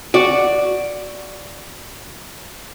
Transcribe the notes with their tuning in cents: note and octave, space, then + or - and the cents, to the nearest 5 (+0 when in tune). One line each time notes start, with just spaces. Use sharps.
F#4 +0 D5 +0